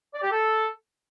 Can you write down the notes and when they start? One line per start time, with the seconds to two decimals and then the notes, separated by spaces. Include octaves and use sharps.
0.13 D5
0.22 G4
0.31 A4